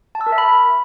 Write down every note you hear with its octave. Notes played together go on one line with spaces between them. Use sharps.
A5
E6
A#4
E5
B5